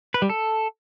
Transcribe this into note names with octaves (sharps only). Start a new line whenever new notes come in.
B4
G3
A4